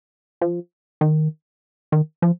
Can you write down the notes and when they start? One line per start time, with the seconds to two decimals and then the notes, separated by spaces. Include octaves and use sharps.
0.41 F3
1.01 D#3
1.92 D#3
2.22 F3